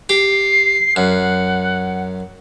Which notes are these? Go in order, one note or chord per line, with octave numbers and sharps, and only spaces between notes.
G4 C7
F#2 F#5